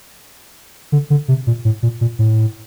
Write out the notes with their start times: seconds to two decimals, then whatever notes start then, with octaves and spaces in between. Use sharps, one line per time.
0.92 D3
1.10 D3
1.28 C3
1.47 A#2
1.65 A2
1.83 A#2
2.01 A#2
2.19 A2